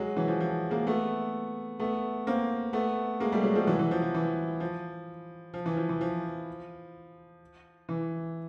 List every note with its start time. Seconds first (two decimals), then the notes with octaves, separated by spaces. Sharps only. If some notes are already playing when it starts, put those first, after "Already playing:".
Already playing: F#3 G#3
0.16 E3 F#3
0.28 F3
0.40 F3
0.70 G#3 A#3
0.87 A3 B3
1.79 A3 B3
2.27 A#3 C4
2.73 A3 B3
3.20 G#3 A#3
3.32 G3 A3
3.43 F#3 G#3
3.55 F3 G3
3.67 E3 F#3
3.79 E3
3.91 F3
4.02 F3
4.14 E3
4.60 F3
5.54 F3
5.66 E3
5.77 F3
5.89 E3
6.01 F3
7.89 E3